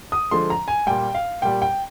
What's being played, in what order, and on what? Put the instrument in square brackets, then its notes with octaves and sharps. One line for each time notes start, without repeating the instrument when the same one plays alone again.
[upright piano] D#6
D3 F3 G#3 C6
A#5
G#5
A#2 G3 G5
F5
A#2 G3 G5
G5